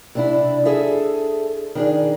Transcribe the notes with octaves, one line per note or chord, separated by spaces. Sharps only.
C3 D4 E4
G#4 A4 E5
D#3 D4 G#4